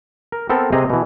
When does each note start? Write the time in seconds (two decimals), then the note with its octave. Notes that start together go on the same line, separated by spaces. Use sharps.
0.32 A#4
0.50 B3 C4 A4 A#4
0.72 C3 C4 G#4 D#5 A#5
0.90 B2 E3